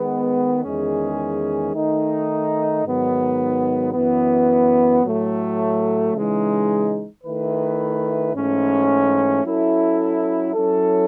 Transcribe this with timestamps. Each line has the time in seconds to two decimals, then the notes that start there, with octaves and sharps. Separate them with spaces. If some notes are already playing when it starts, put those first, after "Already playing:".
Already playing: D#3 G#3 B3
0.64 E2 D#3 G#3 C#4 G#4
1.73 D#3 A3 D#4
2.84 G#2 D#3 F#3 B3
3.93 F#2 E3 B3
5.04 A2 F#3 A3
6.13 C#3 E3 G#3 D#4
7.24 D#3 A3 E4 B4
8.34 G#2 E3 A3 C#4
9.44 F#3 C#4 E4 A4
10.54 F#3 C#4 E4 A4